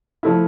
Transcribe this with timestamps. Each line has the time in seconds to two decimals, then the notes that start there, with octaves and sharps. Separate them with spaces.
0.23 F3 A3 E4